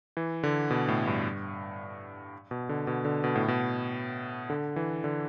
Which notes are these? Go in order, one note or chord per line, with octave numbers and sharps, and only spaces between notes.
E3
D3
B2
A2
G2
B2
D3
B2
D3
B2
A2
B2
D3
E3
D3